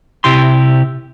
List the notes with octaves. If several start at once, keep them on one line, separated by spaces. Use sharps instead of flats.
C3 E4 G4 C6